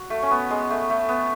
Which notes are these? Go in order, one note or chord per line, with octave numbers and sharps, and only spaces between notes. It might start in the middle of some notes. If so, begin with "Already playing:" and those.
Already playing: F#4
A3
C#4
B3
G#3
A3
A3
B3